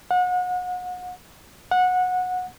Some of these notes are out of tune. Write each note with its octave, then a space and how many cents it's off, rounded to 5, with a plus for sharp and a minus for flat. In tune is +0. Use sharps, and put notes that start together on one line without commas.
F#5 -35
F#5 -20